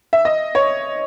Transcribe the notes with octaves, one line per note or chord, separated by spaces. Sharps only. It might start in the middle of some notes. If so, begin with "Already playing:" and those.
E5
D#5
C#5